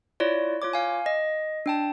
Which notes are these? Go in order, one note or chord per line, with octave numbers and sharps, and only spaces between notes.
E4 F4 C#5 D5
F4 C#5 D6
F5 G#5
D#5
D4 G5 A5